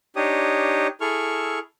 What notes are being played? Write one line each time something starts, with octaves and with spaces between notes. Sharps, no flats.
D4 D#4 G4 C#5 D#6
E4 G#4 A4 C#6 F6